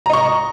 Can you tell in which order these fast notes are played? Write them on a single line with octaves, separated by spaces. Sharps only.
A#5 D#5 C#6